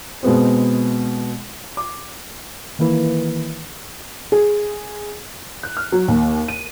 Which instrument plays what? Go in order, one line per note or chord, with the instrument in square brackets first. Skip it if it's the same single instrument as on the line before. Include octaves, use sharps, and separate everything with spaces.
[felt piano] B2 G#3 B3 C4
D6
[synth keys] D#3 E3 A#3 E4 B4
[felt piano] G#4
[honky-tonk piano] F#6
F6
F#3
D#2
D#7